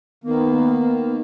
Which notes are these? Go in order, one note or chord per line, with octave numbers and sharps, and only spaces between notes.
D#3 A#3 B3